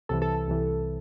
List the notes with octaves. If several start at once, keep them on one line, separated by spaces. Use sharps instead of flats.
C2 C3 E3 A4
A4
A4
C2 C3 E3